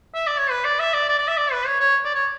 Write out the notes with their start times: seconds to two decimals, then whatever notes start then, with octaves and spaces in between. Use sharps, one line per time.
0.15 E5
0.27 D5
0.38 C#5
0.50 B4
0.64 D5
0.79 E5
0.93 D5
1.08 D5
1.18 D5
1.27 E5
1.37 D5
1.52 B4
1.66 C#5
1.80 C#5
2.05 D5
2.15 C#5